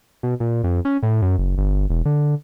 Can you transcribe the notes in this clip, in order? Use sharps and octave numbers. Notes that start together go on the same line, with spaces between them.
B2
A#2
F2
C#4
A2
F#2
F#1
G1
E1
D3